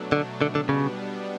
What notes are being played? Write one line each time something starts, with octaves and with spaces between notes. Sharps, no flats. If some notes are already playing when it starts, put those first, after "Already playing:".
Already playing: B2 F#3 A3 D4
D3
B2 D3 G3 B3 D4
D3
C#3